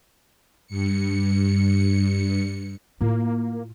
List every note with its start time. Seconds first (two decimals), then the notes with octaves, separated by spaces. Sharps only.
0.67 G2 C#7
3.01 A2 A#3 F4